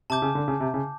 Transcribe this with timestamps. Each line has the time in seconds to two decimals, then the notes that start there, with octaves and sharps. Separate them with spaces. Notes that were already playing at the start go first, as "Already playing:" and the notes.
0.10 C3 A5 D6 G6
0.22 C#3
0.35 D3
0.48 C#3
0.60 C3
0.74 C#3